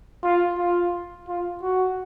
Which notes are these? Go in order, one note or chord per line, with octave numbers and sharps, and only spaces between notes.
F4
F4
F4
F#4